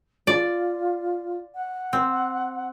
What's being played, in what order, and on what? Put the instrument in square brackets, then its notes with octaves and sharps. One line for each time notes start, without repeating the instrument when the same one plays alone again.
[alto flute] F4 [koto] D5
[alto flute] F#5
[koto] C4